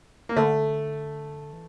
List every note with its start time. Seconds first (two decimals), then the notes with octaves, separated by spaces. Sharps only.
0.29 A#3
0.36 D3 A3
1.53 E3